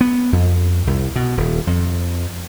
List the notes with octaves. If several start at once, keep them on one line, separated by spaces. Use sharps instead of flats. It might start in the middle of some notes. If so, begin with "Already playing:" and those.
B3
F2
C2
B2
D#1
F2